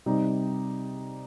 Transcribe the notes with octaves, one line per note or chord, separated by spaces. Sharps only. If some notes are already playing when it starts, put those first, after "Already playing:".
C3 G3 D#4